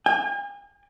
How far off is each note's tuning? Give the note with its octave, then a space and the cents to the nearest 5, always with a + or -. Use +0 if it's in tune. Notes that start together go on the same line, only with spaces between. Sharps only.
G#5 -45